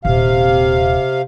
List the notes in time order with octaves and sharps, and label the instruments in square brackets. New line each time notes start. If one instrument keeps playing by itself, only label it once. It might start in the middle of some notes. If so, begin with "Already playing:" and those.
[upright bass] D#1 [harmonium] C3 F5